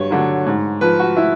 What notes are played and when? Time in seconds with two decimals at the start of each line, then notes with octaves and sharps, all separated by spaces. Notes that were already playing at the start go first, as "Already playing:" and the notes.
Already playing: G2 F#3 C#5
0.11 D3 F#3
0.46 G#2
0.81 F3 B4
1.00 F#4
1.17 E4